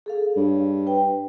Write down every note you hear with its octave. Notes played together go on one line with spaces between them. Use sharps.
G#4 A4 F5
G2 C#5
B4 G5